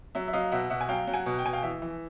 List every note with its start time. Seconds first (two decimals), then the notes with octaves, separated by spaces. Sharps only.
0.15 F#3 E5
0.28 E5
0.33 F#3 D#5 F5
0.51 B2 E5 F#5
0.70 B2 E5 F#5
0.81 G#5
0.89 F#3 F5 G5
1.07 F#3
1.14 F#5 G#5
1.26 B2
1.38 G5
1.44 B2 G#5
1.53 F5 G5
1.63 E3 E5
1.82 E3